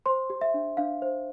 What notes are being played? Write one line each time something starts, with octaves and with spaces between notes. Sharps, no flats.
C5 C6
G4
E5
D4
D4 F5
C5